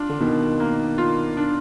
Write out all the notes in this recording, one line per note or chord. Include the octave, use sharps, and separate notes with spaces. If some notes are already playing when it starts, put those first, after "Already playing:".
Already playing: D4 F4
D3
B2 D#3
A#3
F4
D4